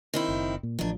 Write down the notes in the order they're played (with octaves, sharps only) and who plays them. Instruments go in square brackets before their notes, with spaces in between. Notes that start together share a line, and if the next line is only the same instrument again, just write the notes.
[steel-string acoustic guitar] D#3 C4 E4
[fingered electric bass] F#1
A#2
[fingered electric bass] A1 F3 [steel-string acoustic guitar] D#3 D4